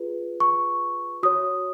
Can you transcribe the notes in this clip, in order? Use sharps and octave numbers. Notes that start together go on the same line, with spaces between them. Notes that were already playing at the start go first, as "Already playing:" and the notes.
Already playing: F4 G#4 B4
C#6
F#4 C#5 D#6